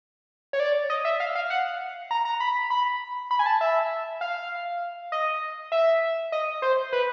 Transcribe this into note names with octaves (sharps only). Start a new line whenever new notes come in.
C#5
D5
D#5
E5
F5
F5
F#5
A#5
A#5
B5
B5
B5
G#5
A5
E5
F5
D#5
E5
D#5
C5
B4